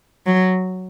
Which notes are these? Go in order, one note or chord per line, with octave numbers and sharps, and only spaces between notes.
F#3